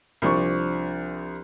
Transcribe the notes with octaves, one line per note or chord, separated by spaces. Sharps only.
C2 F3 D4 C#6